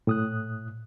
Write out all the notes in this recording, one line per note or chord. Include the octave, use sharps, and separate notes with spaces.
A2 D#6 F#6